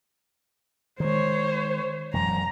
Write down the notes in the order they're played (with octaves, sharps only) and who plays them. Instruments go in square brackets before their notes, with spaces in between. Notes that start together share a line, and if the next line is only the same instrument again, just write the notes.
[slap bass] D#3 G#3 [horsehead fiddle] C5 C#5
[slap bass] E1 F#2 [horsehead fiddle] A#5